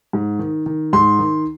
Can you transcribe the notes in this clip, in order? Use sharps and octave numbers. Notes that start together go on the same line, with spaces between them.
G#2
D#3
D#3
G#2 C6
D#3